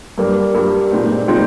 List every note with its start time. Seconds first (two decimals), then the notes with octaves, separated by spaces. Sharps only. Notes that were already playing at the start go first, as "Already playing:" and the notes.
0.18 G2 G3 A#3
0.55 G2 G3 A#3
0.92 A#2 G#3 C4 D#4
1.28 A#2 G#3 C4 D#4